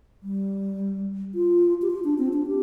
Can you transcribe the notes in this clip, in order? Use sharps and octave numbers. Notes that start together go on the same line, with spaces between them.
G3
F4
G4
F4
D4
C4
D4
G4